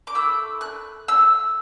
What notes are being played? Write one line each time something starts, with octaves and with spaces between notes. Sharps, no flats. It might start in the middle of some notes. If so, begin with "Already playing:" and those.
D6
A3 E4 E6
F#6
E6